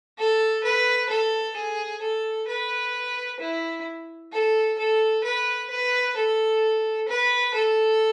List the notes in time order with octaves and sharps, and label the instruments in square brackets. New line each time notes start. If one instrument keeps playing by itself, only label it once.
[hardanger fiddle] A4
B4
A4
G#4
A4
B4
E4
A4
A4
B4
B4
A4
B4
A4